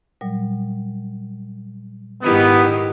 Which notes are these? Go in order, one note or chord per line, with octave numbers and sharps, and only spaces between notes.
A#2 F#3 G3
G#2 D#3 B3 E4 G4